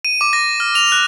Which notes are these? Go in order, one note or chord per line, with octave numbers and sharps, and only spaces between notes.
D#7
D6
A#6
F6
F7
F#6